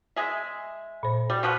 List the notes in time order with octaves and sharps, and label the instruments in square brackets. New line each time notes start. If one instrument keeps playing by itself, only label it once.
[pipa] G#3 G#4 E5
[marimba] A#2 C5
[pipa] G3 [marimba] F#4
[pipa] B2 F3 B3